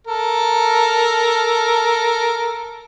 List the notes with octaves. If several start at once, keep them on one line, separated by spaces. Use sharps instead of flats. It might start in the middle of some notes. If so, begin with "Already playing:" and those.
A4 A#4